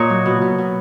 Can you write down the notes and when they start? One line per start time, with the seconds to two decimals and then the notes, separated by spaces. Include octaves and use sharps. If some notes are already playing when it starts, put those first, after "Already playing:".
Already playing: A#2 C#5 D#5
0.09 F#3
0.25 B2
0.42 B2
0.58 B2